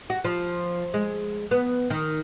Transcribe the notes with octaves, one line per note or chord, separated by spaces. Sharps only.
F#4
F3
G#3
B3
D#3